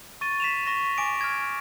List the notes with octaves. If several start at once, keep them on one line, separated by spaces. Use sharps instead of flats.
C#6 A6 D#7
B6 E7 F7
C#6 A#6
G#5 D6 D7
F6 G#6